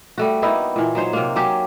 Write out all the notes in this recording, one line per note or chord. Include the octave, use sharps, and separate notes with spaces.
G3 A3 F#4
A#3 B3 D#4 E4
A#2 E3
F#3 D#4 C5 C#5
C3 A#3
F#3 C4 C#4 G4